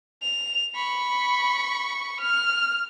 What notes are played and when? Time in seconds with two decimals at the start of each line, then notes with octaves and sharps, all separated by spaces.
0.22 F7
0.75 B5 C#6
2.20 F6